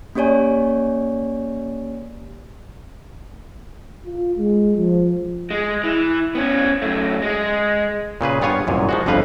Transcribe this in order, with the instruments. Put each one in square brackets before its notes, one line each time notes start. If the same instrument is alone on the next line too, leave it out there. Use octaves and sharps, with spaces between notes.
[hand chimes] A#3 C#4 G4 C#5 D5 G#5
[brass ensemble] F4
G#3
F3
[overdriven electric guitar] G#3
E3
B3 C#4
F#2 A3
G#3
[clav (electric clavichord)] A#2 C#3 G#4 B4
G2 B3 F4 C#5 G#5
C2 F#2 A#2
F3 G#3 F#4
G1 F2 D3 F3 B4 F5